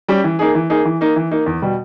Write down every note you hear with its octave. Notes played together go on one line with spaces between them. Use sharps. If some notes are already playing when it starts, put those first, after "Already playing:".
G3 C#4 G4
E3
A#3 D#4 G#4
E3
A#3 D#4 G#4
E3
A#3 D#4
E3
A#3 D#4
E2
B2 G3